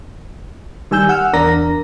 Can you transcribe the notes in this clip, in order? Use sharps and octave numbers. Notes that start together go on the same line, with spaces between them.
D#3 G3 G#5 E6 G6
F#5 E6 F6
E2 D4 A#4 D5 A#5 A#6